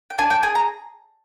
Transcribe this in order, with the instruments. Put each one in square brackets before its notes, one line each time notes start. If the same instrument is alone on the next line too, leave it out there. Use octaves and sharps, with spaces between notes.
[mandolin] G5
D4 G#5
G5
G#4 G#5
A#5